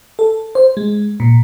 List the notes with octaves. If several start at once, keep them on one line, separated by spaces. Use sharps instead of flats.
A4
C5
G#3
A#2